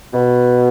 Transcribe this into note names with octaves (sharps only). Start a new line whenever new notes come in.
B2